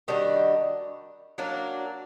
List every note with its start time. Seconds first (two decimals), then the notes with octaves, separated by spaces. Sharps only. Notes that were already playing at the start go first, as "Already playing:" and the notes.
0.08 D#3 G3 D4 F#4
1.38 F#3 A#3 D4